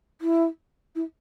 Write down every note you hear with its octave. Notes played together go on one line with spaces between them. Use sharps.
E4
E4